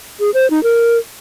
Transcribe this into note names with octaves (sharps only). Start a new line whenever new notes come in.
G#4
C5
D#4
A#4